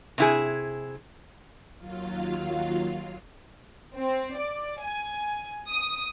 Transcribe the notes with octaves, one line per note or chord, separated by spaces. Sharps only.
C3 E4 G#4
D#2 F#3 F4 F5
C4
D5
G#5
D#6